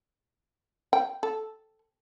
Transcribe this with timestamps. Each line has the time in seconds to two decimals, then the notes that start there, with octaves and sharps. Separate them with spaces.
0.93 G5
1.23 A4